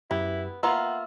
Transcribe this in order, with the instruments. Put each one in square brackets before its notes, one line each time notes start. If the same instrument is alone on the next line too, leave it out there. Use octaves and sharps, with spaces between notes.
[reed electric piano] F#2 G4 [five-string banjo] B3 [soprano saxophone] E4
[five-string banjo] A#3 F4 [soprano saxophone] B3 [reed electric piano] E5 E6